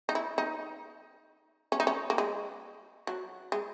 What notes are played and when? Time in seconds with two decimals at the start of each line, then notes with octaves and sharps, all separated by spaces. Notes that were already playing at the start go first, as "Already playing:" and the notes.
0.09 D#4
0.15 E4
0.38 D#4
1.72 C#4
1.80 D#4
1.87 C#4
2.10 A#3
2.18 G#3
3.07 F#3
3.52 G#3